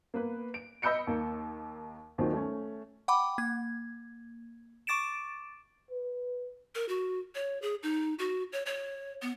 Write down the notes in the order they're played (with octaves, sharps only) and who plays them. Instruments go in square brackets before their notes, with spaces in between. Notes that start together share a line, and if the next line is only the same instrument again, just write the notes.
[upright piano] A#3 B3 B4
D7
D#5 B5 E6 G6 C#7 D7
D#2 A#3
D#2 A#2 D#3 F#3 C4
A3 C#4
[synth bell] F#5 G5 B5 D6
A#3 G#6
C#6 D6 A6 D7 E7
[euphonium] B4
[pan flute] A#4
F#4
C#5
G#4
D#4
F#4
C#5
C#5
B3